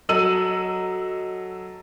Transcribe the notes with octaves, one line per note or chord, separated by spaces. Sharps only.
F#3 A4 D#5 E6 D#7 F#7